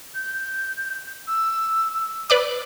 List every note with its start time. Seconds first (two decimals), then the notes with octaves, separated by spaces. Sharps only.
0.15 G6
1.27 E6
2.30 B4 D5 D6